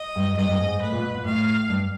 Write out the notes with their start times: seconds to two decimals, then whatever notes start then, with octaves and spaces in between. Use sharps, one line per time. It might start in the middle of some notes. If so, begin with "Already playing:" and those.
Already playing: D#5
0.16 G2
0.37 G2 D#5
0.49 G2
0.59 G#2
0.82 A2 B4
0.92 A#2
1.04 B2
1.14 A#2
1.25 A2 F5
1.69 G2